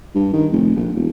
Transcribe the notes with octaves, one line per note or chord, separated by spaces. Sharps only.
G2
D#3
F1
A#1
E1